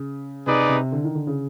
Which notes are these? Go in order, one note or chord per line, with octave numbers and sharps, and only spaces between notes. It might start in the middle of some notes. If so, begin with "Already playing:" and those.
Already playing: C#3
C3 D#4 G#4 B4 D5
C3
D3
D#3
D3
C#3